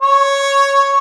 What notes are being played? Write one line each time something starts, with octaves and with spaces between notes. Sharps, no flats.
C#5